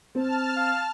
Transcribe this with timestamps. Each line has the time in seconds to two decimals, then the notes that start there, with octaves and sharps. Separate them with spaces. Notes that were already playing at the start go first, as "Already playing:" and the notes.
0.15 C4 A5 F6
0.56 F5